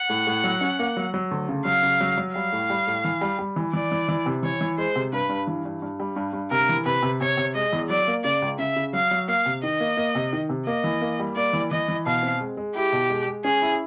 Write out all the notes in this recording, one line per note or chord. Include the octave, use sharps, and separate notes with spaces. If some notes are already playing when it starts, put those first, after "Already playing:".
Already playing: F#5
A2
A2
F#3
C#4
A#3
F#3
F#3
D2
C#3
F#3 F5
C#3
F#3
F#3
G3 F5
A2
G3
A2
E3
G3
G3
E3
E3 D5
E3
E3
C3
E3 C#5
E3
G#3 C5
C3
G2 B4
G2
E3
G2
G2
G3
G2
G2
C3 A#4
E3
C3 B4
C3
C3 C#5
C3
G#3 D#5
E2
F#3 D5
A#3
C#3 D5
C#2
C#3 E5
C#3
F#3 F5
F#3
A#3 F5
C3
D#3 D#5
A#3
A#3
C3
D#3
C3
A#3 D#5
E3
A#3
G3
A#3 D5
E3
E3 D#5
E3
B2 F5
C4
G#3
G#3
E4 G4
B2
G#3
G#3
C#4 G#4
E4